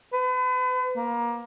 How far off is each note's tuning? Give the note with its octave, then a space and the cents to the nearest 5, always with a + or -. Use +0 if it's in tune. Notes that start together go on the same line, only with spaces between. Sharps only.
B4 +40
A#3 +20